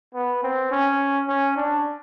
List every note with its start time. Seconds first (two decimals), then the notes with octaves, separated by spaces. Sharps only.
0.15 B3
0.43 C4
0.72 C#4
1.29 C#4
1.57 D4